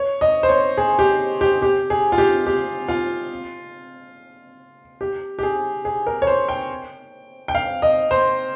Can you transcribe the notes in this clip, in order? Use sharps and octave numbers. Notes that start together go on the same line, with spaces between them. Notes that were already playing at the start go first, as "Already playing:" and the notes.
Already playing: C#5
D#5
C5
C#5
G#4
G4
G4
G4
G#4
F4
G4
G4
F4
G4
G4
G#4
G#4
A#4
C#5
C5
G5
G5
F5
D#5
C5